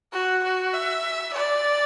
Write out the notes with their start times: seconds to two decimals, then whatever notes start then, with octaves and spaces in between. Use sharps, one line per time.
0.13 F#4
0.43 F#4
0.74 E5
1.34 D5